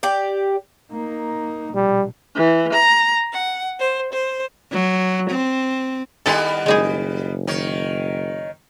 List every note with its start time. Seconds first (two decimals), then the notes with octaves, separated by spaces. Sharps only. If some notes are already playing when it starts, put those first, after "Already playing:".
0.03 G4 D5
0.92 A#3 D#4
1.75 A#1 B2 G3
2.35 E3
2.72 A#5
3.32 F#5
3.79 C5
4.12 C5
4.72 F#3
5.31 C4
6.26 D#3 G3 B3 E4 A4
6.66 F#1 G#3 D#4 G#4
7.47 D#3 C#5